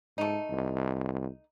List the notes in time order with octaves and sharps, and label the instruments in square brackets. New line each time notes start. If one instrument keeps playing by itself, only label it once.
[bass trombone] G#2 [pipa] A3 D#4
[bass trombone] C2